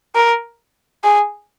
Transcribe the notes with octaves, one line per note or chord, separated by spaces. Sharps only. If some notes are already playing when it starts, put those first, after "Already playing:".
A#4
G#4